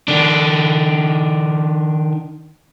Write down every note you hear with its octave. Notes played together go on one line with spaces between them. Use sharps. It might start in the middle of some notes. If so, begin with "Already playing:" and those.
D#3 D4